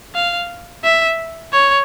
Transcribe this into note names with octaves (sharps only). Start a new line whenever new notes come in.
F5
E5
C#5